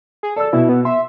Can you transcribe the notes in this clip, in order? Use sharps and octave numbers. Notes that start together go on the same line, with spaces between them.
G#4
A4 D5 E6
B2 E4
B3
E5 C6